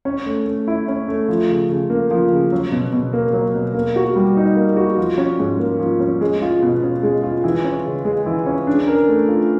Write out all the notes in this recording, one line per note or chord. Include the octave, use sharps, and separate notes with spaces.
C#4
A3
A3
E4
C#4
A3
F3
C#3
C#3
A#3
F3
C#3
F#3
B2
B2
A#3
F#3
B2
A#3
F#4
G3
D#4
A#3
F#4
F3
C#4
G#2
A#3
F3
C#4
G#3
F4
B2
C#4
G#3
F4
E3
C#4
C#3
G#3
E3
C#4
D4
A#4
A3
F4